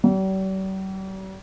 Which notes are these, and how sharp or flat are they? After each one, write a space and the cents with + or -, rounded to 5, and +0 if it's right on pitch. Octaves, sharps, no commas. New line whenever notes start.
G3 -45